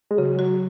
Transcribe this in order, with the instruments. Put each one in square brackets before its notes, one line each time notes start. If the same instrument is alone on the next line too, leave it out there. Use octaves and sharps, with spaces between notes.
[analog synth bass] G#3
[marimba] C#3 [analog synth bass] F#3
[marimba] F#4